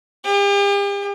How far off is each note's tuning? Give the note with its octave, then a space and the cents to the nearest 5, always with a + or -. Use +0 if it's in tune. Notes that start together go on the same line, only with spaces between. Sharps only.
G4 +45